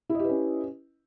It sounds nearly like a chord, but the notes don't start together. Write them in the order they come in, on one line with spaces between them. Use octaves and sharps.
E4 D#5 G4 B4 C#4